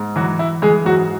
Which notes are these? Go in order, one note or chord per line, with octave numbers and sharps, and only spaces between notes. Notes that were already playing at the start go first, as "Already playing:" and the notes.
Already playing: G#2
E3 F#3 F#4
E3 E4
E3 G#3 G#4
G#2 F#3 F#4